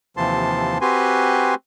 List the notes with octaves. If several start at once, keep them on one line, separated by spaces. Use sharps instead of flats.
D#2 C3 E3 F3 A5 C6
C4 F#4 G4 B4 G#5 C6